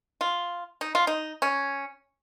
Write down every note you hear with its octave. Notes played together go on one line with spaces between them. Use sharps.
F4
D#4
F4
D#4
C#4